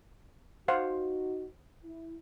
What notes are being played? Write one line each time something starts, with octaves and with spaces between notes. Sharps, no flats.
D#4 F#4 C5 F5 F#5
E4